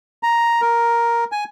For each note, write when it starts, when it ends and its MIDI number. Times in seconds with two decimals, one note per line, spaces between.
0.23 0.61 82
0.61 1.24 70
1.32 1.44 80